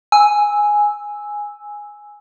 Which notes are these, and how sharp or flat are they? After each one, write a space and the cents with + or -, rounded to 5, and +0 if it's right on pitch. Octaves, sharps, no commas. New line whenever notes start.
G#5 +0 E6 -5